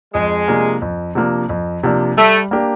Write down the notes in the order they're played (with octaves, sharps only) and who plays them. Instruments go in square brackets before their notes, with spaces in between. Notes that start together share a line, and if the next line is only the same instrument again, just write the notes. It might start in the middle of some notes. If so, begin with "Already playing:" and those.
[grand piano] F2 [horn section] G#3
[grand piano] C3 F3 A#3 D4
F2
C3 F3 A#3 D4
F2
C3 F3 A#3 D4
[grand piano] G3 [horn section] A3
[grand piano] A#3 D4 G4 A#4